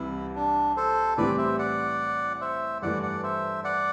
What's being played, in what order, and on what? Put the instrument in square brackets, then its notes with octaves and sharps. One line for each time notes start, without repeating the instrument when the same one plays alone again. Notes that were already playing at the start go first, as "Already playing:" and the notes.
Already playing: [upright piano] C2 C3 E3 G3 [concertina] E4
[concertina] D4
A4 C5
[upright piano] A2 E3 G3 C4 G4 [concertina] B4 D5
[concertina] C5 E5
D5 F#5
C5 E5
[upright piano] G2 E3 A3 [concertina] D5 F#5
[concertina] D5 F#5
C5 E5
D5 F#5